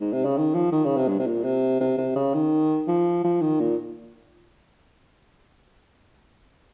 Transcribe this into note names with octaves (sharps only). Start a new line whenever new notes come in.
G#2
C3
C#3
D#3
F3
D#3
C#3
C3
G2
C3
A#2
C3
C3
C3
C#3
D#3
F3
F3
D#3
A#2